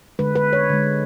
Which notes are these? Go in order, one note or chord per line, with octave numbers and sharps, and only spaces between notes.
D3 G#3 B4
B4
C#5
D3 G#3